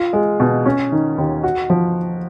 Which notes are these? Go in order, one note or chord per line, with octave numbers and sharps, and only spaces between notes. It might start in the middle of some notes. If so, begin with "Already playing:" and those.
Already playing: F4
G#3
B2
C#4
D#3
D#2
F#4
F3